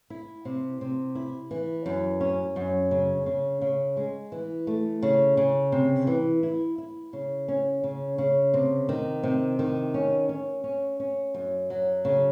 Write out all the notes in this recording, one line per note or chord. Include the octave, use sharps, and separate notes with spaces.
E4
C3
C3
E4
E3
F#2
C#4
F#2
C#3
C#3
C#3
G#3
E3
A3
C#3
C#3
C3
E3
E4
E4
C#3
C#4
C#3
C#3
C3
D#3
C3
D#3
C#4
C#4
C#4
C#4
F#2
F#3
C#3